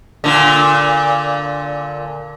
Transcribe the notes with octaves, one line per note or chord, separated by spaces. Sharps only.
A#2 D3